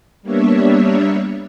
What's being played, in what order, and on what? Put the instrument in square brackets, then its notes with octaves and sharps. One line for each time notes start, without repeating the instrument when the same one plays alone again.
[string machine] G3 A#3 B3 D4 C#5 E5